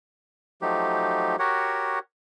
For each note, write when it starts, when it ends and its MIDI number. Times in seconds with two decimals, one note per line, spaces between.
0.62 1.36 53
0.62 1.36 54
0.62 1.36 57
0.62 1.36 63
0.62 1.36 67
1.39 1.99 66
1.39 1.99 67
1.39 1.99 70
1.39 1.99 73
1.39 1.99 78